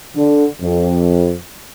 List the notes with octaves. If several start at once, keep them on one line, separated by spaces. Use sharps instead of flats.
D3
F2